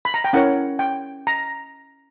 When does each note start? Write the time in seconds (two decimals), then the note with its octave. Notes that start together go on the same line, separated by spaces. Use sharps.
0.05 B5
0.14 A#5
0.24 G5
0.33 C#4 E4 A#4 C#5 F#5
0.79 G5
1.27 A#5